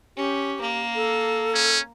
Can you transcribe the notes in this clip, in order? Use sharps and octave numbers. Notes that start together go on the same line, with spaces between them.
C#4 G4
A#3
A4
C#4